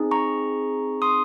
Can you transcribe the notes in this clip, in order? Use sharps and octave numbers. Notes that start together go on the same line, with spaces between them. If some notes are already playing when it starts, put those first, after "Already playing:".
Already playing: C4 D#4 G#4
A#5 C#6
C6 D#6